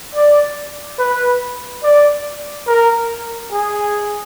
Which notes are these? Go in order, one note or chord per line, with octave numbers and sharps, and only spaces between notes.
D5
B4
D5
A#4
G#4